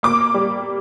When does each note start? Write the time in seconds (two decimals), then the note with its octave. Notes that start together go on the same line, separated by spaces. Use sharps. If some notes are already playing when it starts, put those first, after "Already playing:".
0.03 A#3 D6
0.34 G3